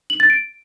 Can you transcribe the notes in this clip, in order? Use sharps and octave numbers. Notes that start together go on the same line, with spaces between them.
F#7
A6
D7